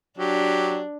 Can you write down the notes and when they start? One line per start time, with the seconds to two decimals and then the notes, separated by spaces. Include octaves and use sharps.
0.18 F#3 D4 G4